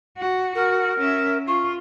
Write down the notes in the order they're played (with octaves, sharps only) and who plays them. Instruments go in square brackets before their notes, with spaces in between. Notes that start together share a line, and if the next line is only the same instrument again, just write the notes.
[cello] F#4
[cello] F#4 [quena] A#4
[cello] C#4 E5
[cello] F4 [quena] C#6